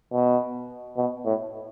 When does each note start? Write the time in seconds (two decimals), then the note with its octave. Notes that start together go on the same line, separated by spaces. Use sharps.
0.12 B2
0.97 B2
1.25 A2